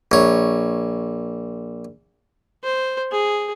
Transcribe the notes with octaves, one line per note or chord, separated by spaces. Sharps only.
A#1 C#5
C5
G#4